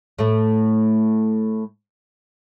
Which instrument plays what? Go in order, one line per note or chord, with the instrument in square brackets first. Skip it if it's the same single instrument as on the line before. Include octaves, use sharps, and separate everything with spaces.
[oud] A2 A3